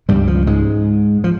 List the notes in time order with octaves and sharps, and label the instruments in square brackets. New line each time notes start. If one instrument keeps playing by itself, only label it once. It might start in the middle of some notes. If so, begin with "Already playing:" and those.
[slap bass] C#2 G2 C#3 G3
F3
G#2 G#3
F3